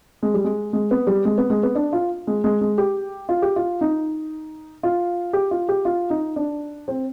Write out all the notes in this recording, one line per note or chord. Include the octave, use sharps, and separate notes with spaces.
G#3
G3
G#3
G#3
B3
G3
G#3
B3
G#3
B3
D4
F4
G#3
G#3
G#3
G4
F4
G4
F4
D#4
F4
G4
F4
G4
F4
D#4
D4
C4